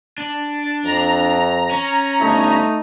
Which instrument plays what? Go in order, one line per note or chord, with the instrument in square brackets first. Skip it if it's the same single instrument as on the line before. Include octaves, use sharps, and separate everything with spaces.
[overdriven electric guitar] D4
[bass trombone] F2 [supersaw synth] A#5
[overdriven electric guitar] C#4
[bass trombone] G1 [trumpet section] A3 D#4